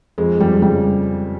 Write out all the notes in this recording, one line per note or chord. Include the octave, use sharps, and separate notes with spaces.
F2 G#3
F2 G3
C#3 G3